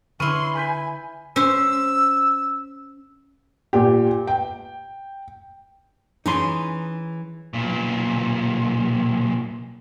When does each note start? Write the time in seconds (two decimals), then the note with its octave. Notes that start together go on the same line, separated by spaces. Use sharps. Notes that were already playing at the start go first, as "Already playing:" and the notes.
0.20 D3 E4 B4 C6 C#6 F6 D#7
0.55 G#5 B5 G6 B6
1.36 C#4 C5 E6
3.73 A#2 G4
4.27 G5
6.26 E3 C#4 D#4 G#4 C6
7.54 B1 A#2